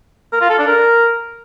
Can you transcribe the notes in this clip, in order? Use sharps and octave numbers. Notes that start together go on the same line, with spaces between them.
A#4
F4
A4
D4
A#4